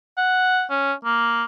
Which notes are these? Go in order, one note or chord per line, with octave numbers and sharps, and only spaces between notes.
F#5
C#4
A#3